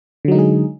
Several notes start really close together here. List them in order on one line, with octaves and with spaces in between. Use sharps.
D3 F#3 D#4 G#3 G#4